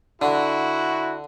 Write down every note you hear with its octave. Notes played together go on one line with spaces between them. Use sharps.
D3 E4 F#4